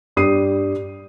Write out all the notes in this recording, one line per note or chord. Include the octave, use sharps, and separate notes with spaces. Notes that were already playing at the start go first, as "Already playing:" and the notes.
G2 G4 D#6 C7 D#7